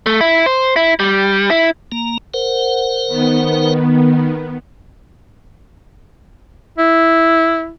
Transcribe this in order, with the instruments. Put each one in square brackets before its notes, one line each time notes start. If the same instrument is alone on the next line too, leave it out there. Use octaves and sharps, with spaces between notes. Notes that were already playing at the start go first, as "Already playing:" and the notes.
[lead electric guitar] A3
E4
C5
E4
G3
E4
[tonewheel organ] A#3 A#5
A#4 C5 F#5
[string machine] D#3 B3
[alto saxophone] E4